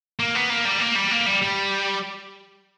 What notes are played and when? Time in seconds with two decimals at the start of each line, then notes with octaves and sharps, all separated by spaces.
0.19 A#3
0.35 B3
0.50 A#3
0.65 G3
0.80 A#3
0.96 G3
1.11 A#3
1.26 G3
1.42 G3